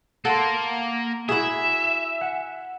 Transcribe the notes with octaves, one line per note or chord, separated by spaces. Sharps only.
A#3 A4 F#5 C6
E4 F#4 G#4 E5
F#5 G#5